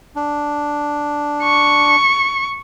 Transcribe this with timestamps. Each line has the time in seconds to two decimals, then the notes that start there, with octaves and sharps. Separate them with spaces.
0.16 D4
1.43 C#6